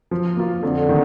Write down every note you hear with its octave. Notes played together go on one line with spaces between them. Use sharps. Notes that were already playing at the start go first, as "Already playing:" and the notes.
F3
A#3 F4
F2 D3
D#3